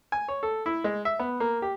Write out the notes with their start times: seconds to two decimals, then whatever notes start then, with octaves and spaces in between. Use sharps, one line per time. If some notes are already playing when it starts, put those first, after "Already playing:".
0.12 G#5
0.28 C#5
0.43 A4
0.66 E4
0.84 G#3
1.05 E5
1.19 B3
1.40 A#3
1.62 G4